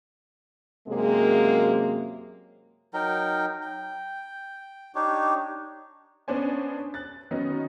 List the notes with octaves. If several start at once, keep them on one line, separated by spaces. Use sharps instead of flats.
F#2 C3 G#3 A#3 C#4 G#4
F#3 D#4 A#4 G5
G5
D4 D#4 G4 C#5
B3 C#4 D4 C5 C#5 G#5
F#6 A6
D#3 F#3 B3 C#4 D#4